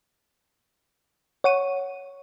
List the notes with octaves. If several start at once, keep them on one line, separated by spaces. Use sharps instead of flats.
C#5 F#5 C#6 D#7